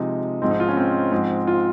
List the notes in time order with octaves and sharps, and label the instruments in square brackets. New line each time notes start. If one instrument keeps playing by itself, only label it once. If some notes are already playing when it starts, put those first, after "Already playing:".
Already playing: [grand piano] C3 F3 G#3 D#4
G#2 F3 G#3 C4
D#4
F4
C#4
C4
G#2 F3 G#3
F4